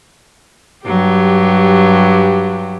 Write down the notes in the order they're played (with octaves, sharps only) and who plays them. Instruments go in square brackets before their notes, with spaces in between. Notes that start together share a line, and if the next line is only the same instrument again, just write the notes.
[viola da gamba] G2 F#3 G4